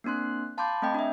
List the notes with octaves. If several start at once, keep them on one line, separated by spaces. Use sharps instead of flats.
A#3 C4 D4 C6 F#6
F5 A5 B5 C6 D6 G6
A3 C4 D#5 G5 G#6
D4 E5